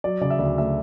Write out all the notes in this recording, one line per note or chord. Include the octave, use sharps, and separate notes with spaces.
F#3 D5
C#3 D5
E5
D2 D5
A3 E5